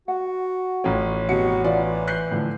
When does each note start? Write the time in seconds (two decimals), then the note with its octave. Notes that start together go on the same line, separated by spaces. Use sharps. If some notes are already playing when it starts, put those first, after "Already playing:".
0.08 F#4 F#5
0.84 A1 C#4 F4 A4 G5
1.29 F1 B2 F#4 F#5 C#7
1.64 E3 F4 D5
2.07 F#6 G6 C7
2.31 A2 D3 F3